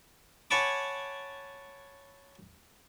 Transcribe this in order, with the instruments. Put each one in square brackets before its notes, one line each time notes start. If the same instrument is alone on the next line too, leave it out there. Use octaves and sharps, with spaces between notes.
[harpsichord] C#5 F#5 G#5 A5 B5 D6